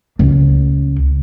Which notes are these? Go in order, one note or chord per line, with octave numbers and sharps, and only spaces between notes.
C#2